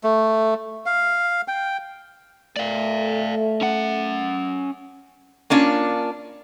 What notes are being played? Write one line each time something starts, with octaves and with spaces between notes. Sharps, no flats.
A3
F5
G5
A3 D5 F5
C#4 F#5
A#3 C#4 D4 F4